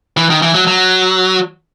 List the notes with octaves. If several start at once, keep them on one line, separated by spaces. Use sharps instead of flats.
E3
D#3
E3
F#3
F#3